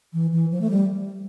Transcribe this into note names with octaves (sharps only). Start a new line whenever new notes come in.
E3
E3
F3
A3
G3